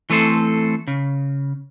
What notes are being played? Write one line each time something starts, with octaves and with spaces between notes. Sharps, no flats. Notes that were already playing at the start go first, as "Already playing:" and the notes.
E3 A3 C4 A4 C5
C#3